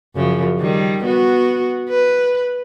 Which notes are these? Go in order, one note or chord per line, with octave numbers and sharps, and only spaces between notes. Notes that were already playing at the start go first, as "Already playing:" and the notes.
F#2 C#3 F3
D#3 G3
B3 F#4
B4